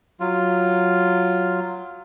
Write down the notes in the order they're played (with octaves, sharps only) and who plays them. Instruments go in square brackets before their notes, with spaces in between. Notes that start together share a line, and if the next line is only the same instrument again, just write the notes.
[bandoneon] F#3 F4